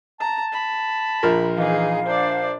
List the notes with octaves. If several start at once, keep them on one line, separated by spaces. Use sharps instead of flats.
A5 A#5
B5
A#1 F3 A#4
E3 D#4 G#4 F5
D4 C5 D5